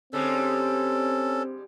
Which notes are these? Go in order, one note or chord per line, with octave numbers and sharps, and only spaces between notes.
D3 G3 G#3 C4 C#4 A4